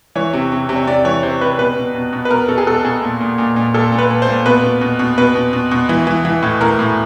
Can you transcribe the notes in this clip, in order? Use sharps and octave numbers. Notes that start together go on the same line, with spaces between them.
E3 C#5
C3
C3
C3
C#5
C3 D5
E3 C#5
C3 C5
C3 B4
B2 B4
B2
B2
B2
B4
B2 A#4
B2 A4
G#4
B2 A4
B2 G#4
A#2
A#2
A#2
A#2
A#2 A4
A#2
B4
A#2
C5
A#2
B2 B4
B2
B2
B2
B2 B4
B2
B2
B2
E3
E3
E3
A2
A2 A#4
A2